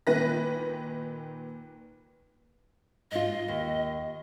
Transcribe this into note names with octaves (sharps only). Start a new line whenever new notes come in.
A#2 D#3 B4 A#6
G#2 F4 D#5
D#2